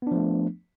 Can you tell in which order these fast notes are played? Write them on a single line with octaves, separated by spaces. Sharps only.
B3 D4 F3 A3